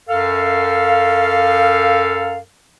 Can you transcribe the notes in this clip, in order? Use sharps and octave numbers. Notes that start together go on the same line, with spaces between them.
F#2 A4 F5